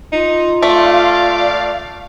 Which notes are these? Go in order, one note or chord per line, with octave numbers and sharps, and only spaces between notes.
D#4 F4
A3 D5 F5